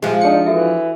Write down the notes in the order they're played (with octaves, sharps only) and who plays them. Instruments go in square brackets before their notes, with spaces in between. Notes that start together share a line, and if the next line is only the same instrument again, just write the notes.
[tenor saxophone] C3 [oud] F3 G#3 [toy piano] G#5
[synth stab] D4 C#7 [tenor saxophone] D#4
[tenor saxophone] E3 [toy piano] F#4 A4 E5